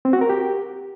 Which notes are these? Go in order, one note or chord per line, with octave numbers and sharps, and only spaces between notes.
C4
F#4
A#4
G4